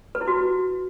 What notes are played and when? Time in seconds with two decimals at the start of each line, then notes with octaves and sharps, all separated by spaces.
0.15 B4
0.21 E4
0.27 F#4